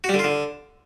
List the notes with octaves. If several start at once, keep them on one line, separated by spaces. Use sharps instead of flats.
F#4
G3
D3
F4
D3